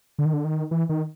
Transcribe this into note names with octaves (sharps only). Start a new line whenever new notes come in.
D3
D#3
D3
D#3
E3
D#3